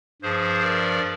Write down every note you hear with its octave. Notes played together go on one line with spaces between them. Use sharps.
G2 F3 G#4 C5
A#4 D5